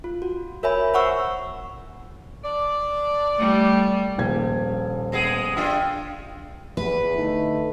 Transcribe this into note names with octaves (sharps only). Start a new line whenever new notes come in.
F4
F#4
A#4 C#5 E5 G#5 B5
C5 F#5 C#6 E6
D4 D5
G3 A3
D#1 A#1 G#6
G#3 B3 G#4
D4 F4 G4 E6
E2 B4
D3 A3 D#4